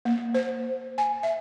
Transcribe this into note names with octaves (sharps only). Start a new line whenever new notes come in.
A#3
C5
G#5
E5